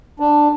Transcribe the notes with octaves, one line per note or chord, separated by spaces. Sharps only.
D4